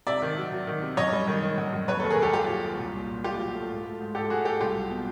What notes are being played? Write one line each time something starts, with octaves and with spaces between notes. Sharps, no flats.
C3 D5 E5
D#3
F#3
F#3
D#3
C3
F#2 C#5 D#5
G3
D#3
D#3
F#2
F#2
D#2 B4 C#5
A4 B4
D#2
G#4 A#4
D#2 G4 A4
D#2 F4 G4
F#3
D#2
C2
A#2
A#2
A#2 F4 G4
F#3
A3
G#2
A3
G#2
G#2 G4 A4
A3 F#4 G#4
A3 G4 A4
C2 F4 G4
F#3
B2